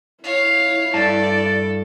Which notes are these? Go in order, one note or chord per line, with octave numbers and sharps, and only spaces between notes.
E4 C#5 F5
G2 A4 D5 A5